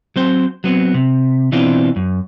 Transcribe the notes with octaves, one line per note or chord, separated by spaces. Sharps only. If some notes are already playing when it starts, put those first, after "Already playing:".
F#3 C4 C5
F#3 B3 C4
C3
B2 E3 C4 D4 F4
F#2